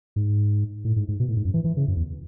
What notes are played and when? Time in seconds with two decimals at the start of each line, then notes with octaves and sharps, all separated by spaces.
0.16 G#2
0.85 A2
0.96 G#2
1.08 G#2
1.20 B2
1.28 A2
1.36 G#2
1.45 F#2
1.54 E3
1.64 E3
1.77 C#3
1.88 F#2
1.96 E2